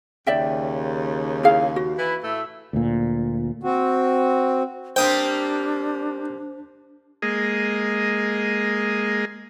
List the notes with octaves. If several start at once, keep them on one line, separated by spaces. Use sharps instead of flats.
D#2 C#3 D5 E5 G5
E4 G#4 F5
F#4
E3 E4 B4
A2 A3 E5
D2 A#2
C4 F#4
G3 A#3 C4 D4 C5 G5 D#6
G#3 A#3 G#4 D#5